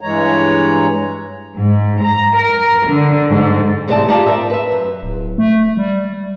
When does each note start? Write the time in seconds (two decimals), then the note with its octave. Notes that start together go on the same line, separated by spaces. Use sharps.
0.01 G2 E3 G#3 C#5 A#5
1.56 G#2
2.02 A#5
2.37 A#4
2.88 D3
3.31 G#2
3.88 E2 G#2 C3 A3 D5 A5
4.08 D#4 F4 G4 D5 F5 A5
4.26 A#4 C5 E5
4.50 B4 E5
4.72 F#2
5.03 D1
5.38 A3
5.77 G3